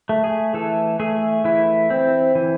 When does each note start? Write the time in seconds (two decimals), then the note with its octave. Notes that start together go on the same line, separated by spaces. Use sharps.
0.09 A3
0.24 G#4
0.54 E3 A4
1.00 A3 G#4
1.44 E3 E4
1.90 C4
2.35 E3